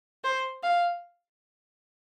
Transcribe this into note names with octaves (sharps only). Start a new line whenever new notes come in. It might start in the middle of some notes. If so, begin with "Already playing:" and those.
C5
F5